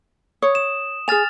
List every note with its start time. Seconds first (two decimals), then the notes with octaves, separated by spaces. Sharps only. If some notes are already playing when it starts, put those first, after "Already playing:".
0.42 C#5 D#6
0.55 E7
1.08 G#4 G#5 F6 A6 F7